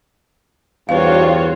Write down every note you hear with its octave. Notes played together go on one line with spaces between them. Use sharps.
E2 G2 F4 F#4 C5 C#5 F5